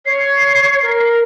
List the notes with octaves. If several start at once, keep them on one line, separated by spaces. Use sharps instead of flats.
C#5 C7
A#4